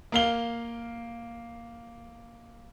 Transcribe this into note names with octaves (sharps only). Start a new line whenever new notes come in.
A#3 F5 G7